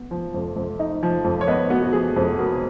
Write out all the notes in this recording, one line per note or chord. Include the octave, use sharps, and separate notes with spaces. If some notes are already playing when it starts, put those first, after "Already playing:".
Already playing: B3
F3
F2
F2
D#4
F3
F2
C#5
B3 B4 D#5
B3 F#4
F#4
F3 G#4
F2
B3 F#4 A#4